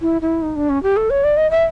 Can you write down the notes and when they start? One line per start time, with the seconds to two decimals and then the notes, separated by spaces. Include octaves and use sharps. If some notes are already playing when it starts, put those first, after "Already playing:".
0.01 E4
0.21 E4
0.43 D#4
0.56 D4
0.69 C#4
0.83 G4
0.97 A4
1.10 C#5
1.24 D5
1.37 D#5
1.51 E5